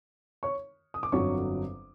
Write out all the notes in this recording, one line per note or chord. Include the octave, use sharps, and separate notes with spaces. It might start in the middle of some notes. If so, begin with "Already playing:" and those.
C#5 C#6
D#6
D6
G1 F2 D3 F#3 C#5 C#6